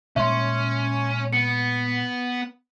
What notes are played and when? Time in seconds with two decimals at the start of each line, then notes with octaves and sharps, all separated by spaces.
0.16 A#2 G3 G#3 C#4 E5 C6
1.33 B3 C#7